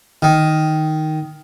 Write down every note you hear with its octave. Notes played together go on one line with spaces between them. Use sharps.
D#3